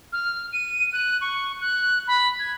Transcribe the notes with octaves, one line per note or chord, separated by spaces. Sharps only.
F6
D#7
F#6
C#6
F#6
B5
G#6